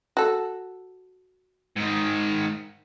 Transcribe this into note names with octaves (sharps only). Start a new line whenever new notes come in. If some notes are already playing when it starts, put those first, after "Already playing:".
F#4 A4
G#2 D#3